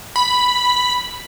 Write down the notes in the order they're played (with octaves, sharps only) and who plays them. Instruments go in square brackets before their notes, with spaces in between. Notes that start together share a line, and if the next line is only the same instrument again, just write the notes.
[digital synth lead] B5